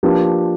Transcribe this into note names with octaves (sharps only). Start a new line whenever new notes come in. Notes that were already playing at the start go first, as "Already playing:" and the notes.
F3 A#3 D4 G4 B4